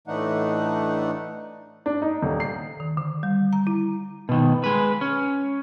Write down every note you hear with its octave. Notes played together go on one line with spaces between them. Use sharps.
A2 E3 A3 D4 D#4 F#5
D4
D#4
D#1
C7
D#3
D3
G3
A#5
E4
B2 D#3
G#3 B4
C#4